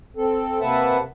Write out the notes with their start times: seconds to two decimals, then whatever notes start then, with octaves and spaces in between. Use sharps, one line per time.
0.17 C4 A4
0.61 C3 A#3 B4 E5 F#5 A5